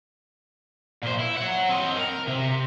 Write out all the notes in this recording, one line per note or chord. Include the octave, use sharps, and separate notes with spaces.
A#2 C5
E4
C#5 F#5
C4 D#5
A#4
C3